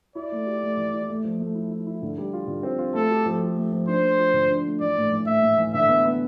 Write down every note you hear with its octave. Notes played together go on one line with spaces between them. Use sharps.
E4 D5
A3
G4
A3
E3
E4
A3
F3
A3
E4
E4
E4
D3
G3
F4
D3
C4
F4
A3 A4
G4
F3
G4
A3
F3
D4 C5
A3
F4
D3
D4
A3
E3 D5
A2
E3
A2 E5
A2
E3
D3 E5
B3
B3